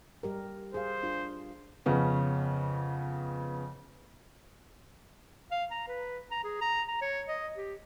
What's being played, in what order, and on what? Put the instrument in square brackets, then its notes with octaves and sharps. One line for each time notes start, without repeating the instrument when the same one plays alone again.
[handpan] G3 G4 A#4
[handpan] G#4 F5 [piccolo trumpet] C5
[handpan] D4 F4
[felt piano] F2 C#3 B3 C#4
[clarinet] F5
A#5
B4
A#5
G#4
A#5
A#5
C#5
D#5
G4